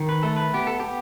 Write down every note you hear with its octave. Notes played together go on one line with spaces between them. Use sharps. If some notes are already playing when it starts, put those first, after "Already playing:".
Already playing: D#3
B4
A3 A4
B4
B3 G4
A4
B3 G4